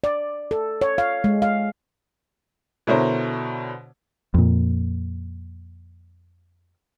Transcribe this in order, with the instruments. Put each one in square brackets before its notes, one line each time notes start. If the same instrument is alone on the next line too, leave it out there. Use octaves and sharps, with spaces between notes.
[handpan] D5
A4
C#5
F5
G#3
F5
[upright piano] B2 D3 E4 A#4 C5 C#5
[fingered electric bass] F2 A#2